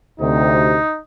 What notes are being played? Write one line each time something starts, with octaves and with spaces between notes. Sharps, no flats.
D2 C3 D#4